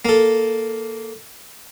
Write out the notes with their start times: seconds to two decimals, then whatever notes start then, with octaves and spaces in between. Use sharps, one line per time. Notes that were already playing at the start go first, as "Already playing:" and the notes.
0.05 A#3 A4